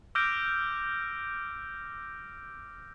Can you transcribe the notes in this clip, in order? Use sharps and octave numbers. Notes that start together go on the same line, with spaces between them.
D6 E6 F6 G6 A#6 D7